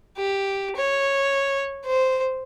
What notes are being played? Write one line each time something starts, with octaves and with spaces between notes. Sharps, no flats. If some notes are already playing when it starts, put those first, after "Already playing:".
G4
C#5
C5